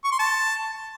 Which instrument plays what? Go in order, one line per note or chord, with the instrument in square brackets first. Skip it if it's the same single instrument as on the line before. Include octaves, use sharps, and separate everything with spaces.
[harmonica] C#6
C6
A5